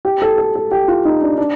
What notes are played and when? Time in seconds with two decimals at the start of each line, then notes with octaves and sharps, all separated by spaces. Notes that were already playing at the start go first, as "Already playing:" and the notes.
0.05 G4
0.22 A4
0.38 A4
0.55 A4
0.71 G4
0.88 F4
1.05 D#4
1.22 D4
1.38 D4